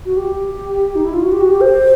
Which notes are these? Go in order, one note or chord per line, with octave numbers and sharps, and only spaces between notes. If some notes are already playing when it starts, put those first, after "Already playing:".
F#4
G4
D#4
E4
F4
F#4
G4
F#4
G4
C5